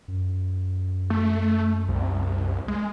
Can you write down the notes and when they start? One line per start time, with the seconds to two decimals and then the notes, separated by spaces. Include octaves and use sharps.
0.08 F#2
1.10 A3
1.88 C2
2.68 G#3